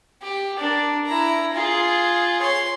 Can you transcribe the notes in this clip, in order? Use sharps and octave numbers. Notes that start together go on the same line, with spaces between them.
G4
D4 A#4
E4 A#5
F4 G#4
C#5 C6